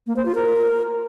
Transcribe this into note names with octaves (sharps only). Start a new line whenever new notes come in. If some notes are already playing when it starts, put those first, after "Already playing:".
A#3
C5
F4
A#4